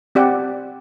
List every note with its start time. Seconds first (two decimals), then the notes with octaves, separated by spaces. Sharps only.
0.15 C4 G4 D5 F#5